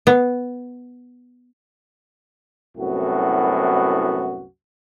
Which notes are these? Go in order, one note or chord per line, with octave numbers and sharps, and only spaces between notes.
B3
C2 F#2 A2 B3 F#4